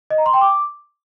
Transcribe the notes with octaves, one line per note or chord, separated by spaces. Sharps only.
D#5
A#5
C6
G5
D6